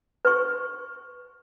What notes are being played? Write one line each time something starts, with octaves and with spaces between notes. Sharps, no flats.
B4 C#6